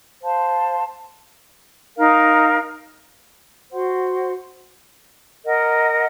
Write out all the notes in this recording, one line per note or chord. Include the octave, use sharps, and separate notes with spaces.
C5 F5 A5 C6
D#4 A#4 F5
F#4 C5 F#5 C6
A#4 D#5 F#5